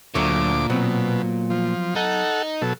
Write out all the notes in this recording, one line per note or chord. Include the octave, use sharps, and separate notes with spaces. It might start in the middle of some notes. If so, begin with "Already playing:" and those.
D2 A#2 F#3 A3 C#5 D6
B2 F#3 B3 C4
F3
D#4 A4 F#5
B2 F#3 A4